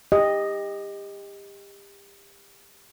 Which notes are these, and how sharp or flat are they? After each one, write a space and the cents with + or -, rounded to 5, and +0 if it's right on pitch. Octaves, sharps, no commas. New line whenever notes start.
G4 +30 D#5 +0